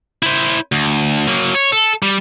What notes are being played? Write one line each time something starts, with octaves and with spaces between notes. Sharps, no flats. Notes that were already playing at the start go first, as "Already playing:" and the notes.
E4 C5
D2
F#3 A#3
C#5
A4
G3